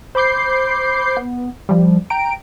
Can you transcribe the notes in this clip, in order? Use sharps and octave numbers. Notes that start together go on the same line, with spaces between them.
C5 B5 D6 G6 C7
B3
F3 G3
G5 A#5 D7